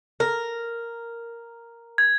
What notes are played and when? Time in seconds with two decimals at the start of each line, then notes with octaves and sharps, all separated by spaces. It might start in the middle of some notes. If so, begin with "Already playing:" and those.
0.20 A#4
1.98 G#6